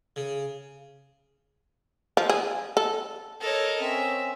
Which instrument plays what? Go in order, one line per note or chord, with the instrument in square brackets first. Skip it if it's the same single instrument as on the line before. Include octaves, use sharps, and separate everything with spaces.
[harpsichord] C#3
[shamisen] F3
G#4
A4
[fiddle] A4 C#5 [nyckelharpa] A#4 D#5
[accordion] C4 C#4 [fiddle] E5